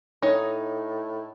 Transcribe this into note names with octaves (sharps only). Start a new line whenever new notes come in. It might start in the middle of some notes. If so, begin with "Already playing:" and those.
A2 D#4 C#5